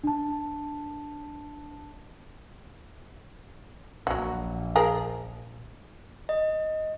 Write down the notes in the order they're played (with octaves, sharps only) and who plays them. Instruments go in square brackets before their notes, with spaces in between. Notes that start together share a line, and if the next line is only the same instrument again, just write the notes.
[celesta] D4 A5
[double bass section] A#1 [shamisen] F#3 F#4
[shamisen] F3 G#4 A#4
[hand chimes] D#5